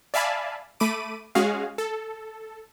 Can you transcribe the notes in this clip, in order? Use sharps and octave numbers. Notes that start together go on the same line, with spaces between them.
D5 E5 F5 G#5 A5 B5
A3 B5 D6 D#7
G#3 C#4 F#4 G#4 F5
A4